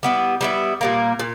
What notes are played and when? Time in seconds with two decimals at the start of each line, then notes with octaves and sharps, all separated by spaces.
0.03 G3 B3 E4
0.41 G3 B3 E4
0.81 A#2 G3 A#3
1.19 A#2